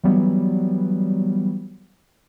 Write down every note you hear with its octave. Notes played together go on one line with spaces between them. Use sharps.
E3 F#3 G3 B3